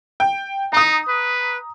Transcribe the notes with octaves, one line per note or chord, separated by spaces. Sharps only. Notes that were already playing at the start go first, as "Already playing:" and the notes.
G5
D#4 A#5 D#6
B4